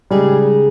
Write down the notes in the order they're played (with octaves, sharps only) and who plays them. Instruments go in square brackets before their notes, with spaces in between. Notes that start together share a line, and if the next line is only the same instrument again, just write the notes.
[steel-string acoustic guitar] C#3 G#3 D#4 G#4 [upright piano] G3